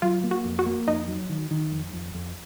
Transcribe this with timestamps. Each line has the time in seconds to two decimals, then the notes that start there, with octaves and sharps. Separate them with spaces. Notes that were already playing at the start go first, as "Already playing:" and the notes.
0.02 F#3 F4
0.24 A#3
0.31 F#4
0.45 F2
0.59 F#4
0.66 A#3
0.87 F2 D#4
1.08 F#3
1.29 D#3
1.51 D#3
1.72 F2
1.93 F2
2.14 F2